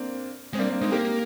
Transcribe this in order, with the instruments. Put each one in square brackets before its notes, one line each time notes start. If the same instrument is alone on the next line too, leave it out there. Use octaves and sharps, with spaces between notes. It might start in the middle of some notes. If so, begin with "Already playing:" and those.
Already playing: [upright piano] A#3 C4 D4
[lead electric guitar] G#3 [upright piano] C4
[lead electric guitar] G3 [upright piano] A#3 D4
[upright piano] A#3 D4
[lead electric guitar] G#3 [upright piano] C4 D#4
[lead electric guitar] A#3 [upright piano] G4 A#4